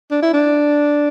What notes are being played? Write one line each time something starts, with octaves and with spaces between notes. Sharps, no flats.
D4
E4
D4